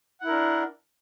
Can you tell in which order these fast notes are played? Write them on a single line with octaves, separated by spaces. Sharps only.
F#5 E4 A#4 D4